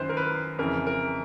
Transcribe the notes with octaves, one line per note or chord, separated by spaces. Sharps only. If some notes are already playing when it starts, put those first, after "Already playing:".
Already playing: F#2 D#3 B4 C5
A#4
B4
F2 C#3 E3 A#4
A#4